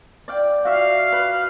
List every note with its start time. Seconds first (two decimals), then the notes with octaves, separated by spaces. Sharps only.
0.28 D5 F5 G5
0.65 F#4 E5 F5
1.12 B4